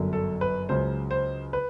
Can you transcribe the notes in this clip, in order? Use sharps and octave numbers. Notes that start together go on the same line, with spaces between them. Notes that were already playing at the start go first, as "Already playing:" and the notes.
Already playing: G1 F#2 D3 F#3
A4
B4
C#2 C#3 F#3 C5
C5
B4